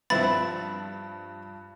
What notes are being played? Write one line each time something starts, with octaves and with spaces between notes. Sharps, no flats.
G2 F3 B3 C4 E4 B5 A6 E7